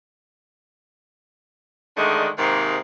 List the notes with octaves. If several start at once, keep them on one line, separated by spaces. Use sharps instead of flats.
D3 D#3 G#3 A3 D4
G#2 C3 D#3 G#3 A#3